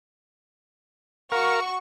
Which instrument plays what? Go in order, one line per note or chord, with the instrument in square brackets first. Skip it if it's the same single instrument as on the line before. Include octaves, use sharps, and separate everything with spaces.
[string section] F#4 C#6 [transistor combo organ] A#4 F5